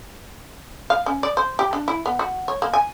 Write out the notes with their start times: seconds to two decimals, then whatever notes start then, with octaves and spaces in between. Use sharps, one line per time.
0.90 F5
1.06 C#4
1.23 D5
1.37 C5
1.59 G4
1.73 D4
1.88 E4
2.06 B3
2.19 F#4
2.48 C#5
2.62 A#3
2.73 G#5